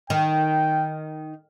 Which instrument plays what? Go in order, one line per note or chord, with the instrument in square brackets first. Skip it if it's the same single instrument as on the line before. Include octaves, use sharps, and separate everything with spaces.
[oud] D#3 [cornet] G5